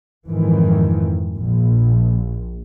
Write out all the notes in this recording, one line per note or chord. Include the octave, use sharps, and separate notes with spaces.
G#1 F2 D#3 E3
A#1